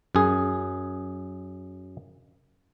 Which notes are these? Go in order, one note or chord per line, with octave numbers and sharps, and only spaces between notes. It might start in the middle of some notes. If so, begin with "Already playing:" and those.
F#2 G#4